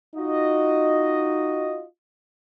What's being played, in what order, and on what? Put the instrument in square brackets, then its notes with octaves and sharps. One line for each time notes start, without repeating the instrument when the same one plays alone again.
[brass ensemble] D#4 F4 F#4 D#5